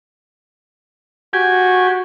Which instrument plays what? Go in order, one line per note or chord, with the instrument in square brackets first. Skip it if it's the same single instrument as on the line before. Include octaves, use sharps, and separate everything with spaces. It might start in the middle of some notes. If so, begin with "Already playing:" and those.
[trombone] F#4 [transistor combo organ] G4 G#5